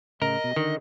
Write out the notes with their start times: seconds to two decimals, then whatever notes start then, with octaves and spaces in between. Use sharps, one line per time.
0.22 A2 C#3 A#4 D#5
0.44 B2
0.56 D3 D#3